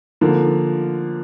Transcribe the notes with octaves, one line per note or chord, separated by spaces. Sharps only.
D3 F3 A#3